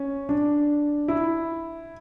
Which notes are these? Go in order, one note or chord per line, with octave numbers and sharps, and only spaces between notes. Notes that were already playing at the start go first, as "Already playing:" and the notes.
Already playing: C#4
D4
E4